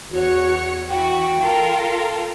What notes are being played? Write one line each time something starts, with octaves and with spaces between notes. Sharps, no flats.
E2 F#4 C#5 C#7
E3 F#4 G5
F4 A4 A#4